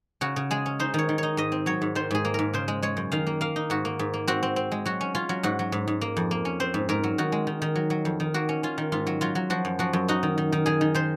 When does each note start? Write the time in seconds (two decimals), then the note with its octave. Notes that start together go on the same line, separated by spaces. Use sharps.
0.21 C#3 F#4
0.36 C#3
0.51 G#3 G#4
0.66 C#4
0.79 D#4 C5
0.94 D#3 C#5
1.09 D#3
1.18 D#4 C#5
1.37 G#2 D#5
1.52 C4
1.66 F#3 C#5
1.82 G#2
1.95 D#3 C5
2.11 G#2 G#4
2.25 A#3
2.34 G#2 A#4
2.53 C#3 C5
2.68 G#3
2.82 G#3 C#5
2.97 F#2
3.12 D#3 F5
3.26 A#3
3.41 A#3 F5
3.56 D#4
3.70 G#2 F#4
3.85 A#3
3.99 G#2
4.14 A#3
4.28 C4 F#4
4.43 C4
4.56 C4
4.72 G#3
4.85 F#3 F#4
5.01 C#4
5.15 C#4 F4
5.29 F#3
5.43 G#2 F#4
5.59 F#3
5.72 G#2
5.88 G#2
6.01 A#3
6.17 F2
6.31 A#3
6.45 C#4
6.60 C4 C5
6.74 G#2
6.89 G#2 A#4
7.03 F#3
7.18 D#3 F#4
7.32 G#3
7.47 D#3
7.62 D#3
7.75 F#3
7.90 F#3
8.05 F2
8.20 D#3
8.34 A#3 F#4
8.49 C#4
8.63 C#4 F4
8.78 D#3
8.92 G#2 F4
9.07 F#3
9.21 F#3 F4
9.35 F#3
9.50 F3 F#4
9.65 F#2
9.79 F3 F#4
9.93 F#2
10.08 D#4 F#4
10.23 D#3
10.38 D#3
10.52 D#3
10.66 D#3 G#4
10.81 D#3
10.94 D#3 C5